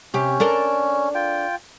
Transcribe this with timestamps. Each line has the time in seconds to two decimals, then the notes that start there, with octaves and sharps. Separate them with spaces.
0.14 C3 C#4 G4
0.40 D4 A4 A#4
1.15 F4 G5